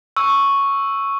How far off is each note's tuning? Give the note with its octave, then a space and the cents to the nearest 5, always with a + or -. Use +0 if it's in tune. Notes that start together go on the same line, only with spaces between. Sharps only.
C#6 +0 E6 +0